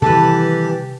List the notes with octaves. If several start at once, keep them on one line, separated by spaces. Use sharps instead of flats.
C3 D#3 E3 G3 G4 A4 B4 A5